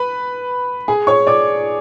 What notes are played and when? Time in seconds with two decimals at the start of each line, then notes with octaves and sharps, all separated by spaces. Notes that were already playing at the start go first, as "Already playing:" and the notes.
Already playing: B4 B5
0.88 G#4 G#5
1.07 C#5 C#6
1.27 D5 D6